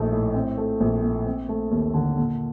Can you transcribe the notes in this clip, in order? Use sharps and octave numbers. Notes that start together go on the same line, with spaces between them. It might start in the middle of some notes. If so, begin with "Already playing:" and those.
Already playing: A#1 A3 D#4
A2
C4
A3
A#1
A#2
C4
A3
D#2
D3
A#2